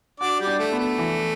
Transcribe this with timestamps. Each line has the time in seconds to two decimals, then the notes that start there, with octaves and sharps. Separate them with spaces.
0.20 D4 F#4 D5
0.40 G3 G4
0.47 D4
0.59 A3
0.72 B3
0.79 A3
0.98 E3